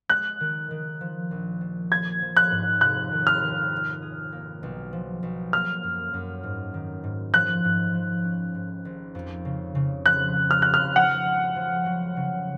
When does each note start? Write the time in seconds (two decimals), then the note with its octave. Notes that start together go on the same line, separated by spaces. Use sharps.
0.10 G#3 F#6
0.40 D#3
0.71 D#3
1.01 F3
1.31 A#1
1.61 F3
1.91 A#3 G#6
2.22 F3
2.37 F#6
2.51 G#2
2.81 F1 F#6
3.11 D#3
3.27 F6
3.42 D#3
3.72 D#4
4.02 G#4
4.32 A#3
4.63 B1
4.93 F3
5.23 B1
5.53 A#3 F6
5.83 F#2
6.13 F#2
6.43 G#2
6.74 D#3
7.04 G#2
7.34 F3 F#6
7.64 G#2
7.94 F3
8.24 C#4
8.55 G#2
8.85 G#1
9.15 F2
9.45 C#3
9.75 C#3
10.06 F3 F#6
10.36 F3
10.51 F6
10.62 F#4 F#6
10.74 F6
10.96 F3 F#5
11.26 G#3
11.56 F3
11.86 F#3
12.17 C#3